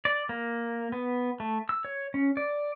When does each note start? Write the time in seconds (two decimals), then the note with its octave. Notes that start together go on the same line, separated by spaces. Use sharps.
0.05 D5
0.29 A#3
0.92 B3
1.40 A3
1.69 E6
1.85 C#5
2.14 C#4
2.37 D5